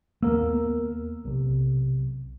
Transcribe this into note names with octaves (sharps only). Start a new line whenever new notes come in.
D#2 A#3 B3 A#4 E6
B1 C3